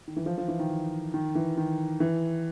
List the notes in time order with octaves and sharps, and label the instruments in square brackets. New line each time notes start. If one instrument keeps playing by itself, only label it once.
[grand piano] D#3
E3
F3
F3
E3
D#3
D#3
E3
D#3
E3